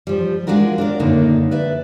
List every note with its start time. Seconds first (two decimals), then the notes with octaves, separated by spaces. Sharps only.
0.07 F3 G3
0.47 G#3 D4 F4 F#4 A#4
0.78 D4 A#4 D5
0.99 F#2 A2 D3 D#3 A#3 D#4
1.51 B4 D5 E5